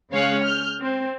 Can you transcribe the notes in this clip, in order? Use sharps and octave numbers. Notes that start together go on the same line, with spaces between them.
C#3 G#3 C#4 C#5 F5 F#6
F6 G6
C4